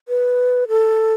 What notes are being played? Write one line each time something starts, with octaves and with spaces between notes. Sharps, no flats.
B4
A4